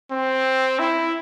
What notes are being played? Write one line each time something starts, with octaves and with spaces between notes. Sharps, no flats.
C4
E4